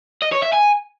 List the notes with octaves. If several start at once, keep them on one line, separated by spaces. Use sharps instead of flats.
D#5
C#5
E5
G#5